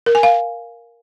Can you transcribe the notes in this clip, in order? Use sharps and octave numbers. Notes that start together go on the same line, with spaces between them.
A#4
G#5
F5